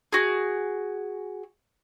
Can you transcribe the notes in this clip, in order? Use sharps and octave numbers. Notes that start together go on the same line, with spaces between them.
F#4 G#4